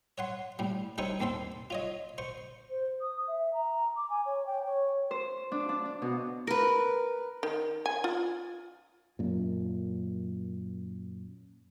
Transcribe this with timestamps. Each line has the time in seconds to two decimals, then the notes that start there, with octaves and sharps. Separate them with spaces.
0.18 C#5 F#5 C6
0.59 A2 G3
0.98 G3 D#4 A4 C5 C#5 C#6
1.20 D#2 C4 A4 C6
1.70 F4 C#5 D#5
2.18 C5 C#6
2.70 C5
3.01 D#6
3.28 E5
3.54 A#5
3.97 D6
4.10 G#5
4.26 C#5
4.46 G5
4.66 C#5
5.11 C5
5.52 D4
5.69 D4
5.85 D4
6.02 B2
6.47 A#4 B4
7.43 D#3
7.86 G#5
8.04 F4
9.19 F#2 A#2